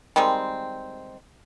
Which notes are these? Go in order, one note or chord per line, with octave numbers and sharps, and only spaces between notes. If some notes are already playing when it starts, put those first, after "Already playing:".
D#3 G3 G#3 C4